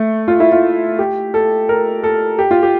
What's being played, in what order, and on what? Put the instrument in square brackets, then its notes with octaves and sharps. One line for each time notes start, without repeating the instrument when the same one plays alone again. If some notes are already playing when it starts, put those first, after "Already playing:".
Already playing: [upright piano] A3
F4
E4
F4
G4
A4
A#4
A4
G4
F4
G4